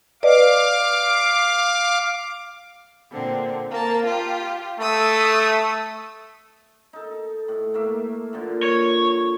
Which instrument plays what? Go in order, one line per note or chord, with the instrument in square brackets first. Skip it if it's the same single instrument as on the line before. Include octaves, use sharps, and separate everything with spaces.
[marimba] B4 D5 D#5 [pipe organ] F5 D6
[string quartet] A#2 D3 C4
A#3 A5
F4 G4
[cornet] A3 [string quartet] D#6 E6
[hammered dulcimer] D#4 A4
A2
A3 A#3 E5
A#2 D3 F3
[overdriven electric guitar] C#5